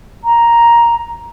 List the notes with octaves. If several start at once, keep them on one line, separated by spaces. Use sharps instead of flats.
A#5